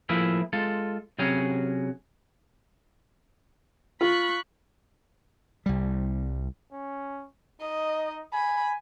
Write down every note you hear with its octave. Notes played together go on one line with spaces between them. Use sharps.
A2 F3 A#3 E4 G#4 E5
G#3 F4 A4
C3 F#3 C#4 F#4 G#4
F4 B5 C#6 F#6
C2 G3
C#4
D#4 D#5
G#5 B5